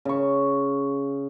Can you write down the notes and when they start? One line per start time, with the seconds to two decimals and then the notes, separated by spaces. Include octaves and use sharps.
0.05 C#3 C#6